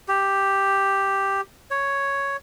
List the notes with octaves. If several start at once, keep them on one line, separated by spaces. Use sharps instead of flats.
G4
C#5